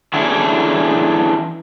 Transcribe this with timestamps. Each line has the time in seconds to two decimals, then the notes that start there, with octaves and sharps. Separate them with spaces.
0.14 E3 C#4 D4 E4 G#4 A4